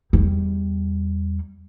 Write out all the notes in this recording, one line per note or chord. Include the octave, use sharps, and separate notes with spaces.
E2 G3